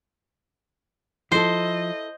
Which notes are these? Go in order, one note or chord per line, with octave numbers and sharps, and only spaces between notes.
F3 E4 A4 C5 D#5